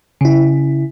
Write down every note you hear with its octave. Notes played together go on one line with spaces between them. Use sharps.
C#3 E4